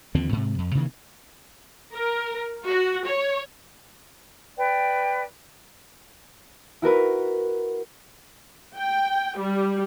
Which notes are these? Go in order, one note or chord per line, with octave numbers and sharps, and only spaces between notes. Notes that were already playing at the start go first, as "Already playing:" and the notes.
D#2 D3 F3 C4
G#2 C3
F2
C3 D#3 E3 A#3
A#4
F#4
C#5
B4 D5 G5
E4 F#4 A#4 B4
G5
G3